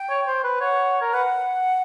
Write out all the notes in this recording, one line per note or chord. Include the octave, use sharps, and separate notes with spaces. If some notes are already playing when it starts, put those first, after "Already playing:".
Already playing: G5
C#5
C5
B4
C#5 F#5
A#4
B4 F#5